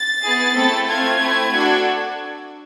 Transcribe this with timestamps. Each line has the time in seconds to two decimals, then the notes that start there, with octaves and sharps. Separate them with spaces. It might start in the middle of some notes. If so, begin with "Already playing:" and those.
Already playing: A6
0.23 B3 E4 G#4
0.55 A3 C4 E4 A4
0.88 A3 C4 F4 G#6
1.20 A3 C4 E4
1.53 D4 F#4 A4